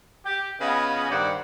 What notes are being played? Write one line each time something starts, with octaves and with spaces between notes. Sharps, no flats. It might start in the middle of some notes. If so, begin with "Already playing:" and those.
G4
C#3 B3 F4 B4 D#5 G#5
G2 D#3 C5 D5 F#5